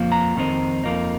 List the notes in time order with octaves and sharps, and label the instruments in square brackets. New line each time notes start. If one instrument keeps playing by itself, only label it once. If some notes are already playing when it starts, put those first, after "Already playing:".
Already playing: [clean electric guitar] F2 F3 A#3
A#5
F2 D#3 C4 D#4
F2 F3 A#3 D#4